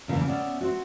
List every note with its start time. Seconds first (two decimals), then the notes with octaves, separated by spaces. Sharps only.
0.08 E2 C#3 E3 A#3 C4
0.27 B3 C#4 D5 E5
0.61 C4 F#4